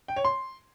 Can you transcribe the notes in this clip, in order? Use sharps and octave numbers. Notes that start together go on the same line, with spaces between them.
G5
C#5
C6